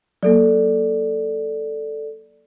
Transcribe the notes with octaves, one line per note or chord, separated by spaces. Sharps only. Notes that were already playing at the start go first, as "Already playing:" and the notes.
F#3 A#3 A4 D5